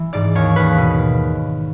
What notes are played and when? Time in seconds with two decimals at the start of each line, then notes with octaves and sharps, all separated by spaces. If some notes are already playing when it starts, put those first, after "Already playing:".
Already playing: E3
0.13 G#2 D5
0.35 D#2 C#5
0.56 D#2 B4
0.78 B2